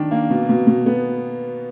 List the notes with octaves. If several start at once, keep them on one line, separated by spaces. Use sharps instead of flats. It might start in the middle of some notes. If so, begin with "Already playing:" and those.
Already playing: D#3 D4
A#3
B2
B2
B2
B3